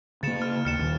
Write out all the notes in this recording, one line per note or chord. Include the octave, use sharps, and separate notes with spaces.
C#3 A#3 A6 C#7 E7
F6
D#2 F6 C#7 E7
D#1 D#3